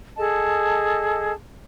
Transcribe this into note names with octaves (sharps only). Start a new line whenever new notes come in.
G#4 A4 D#5 A5